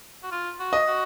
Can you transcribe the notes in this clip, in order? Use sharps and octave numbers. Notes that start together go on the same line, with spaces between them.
F#4
F4
F#4
D#5
F#4